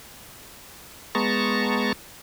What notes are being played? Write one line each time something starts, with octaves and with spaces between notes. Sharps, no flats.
G#3 B3 A5 A#5 C#6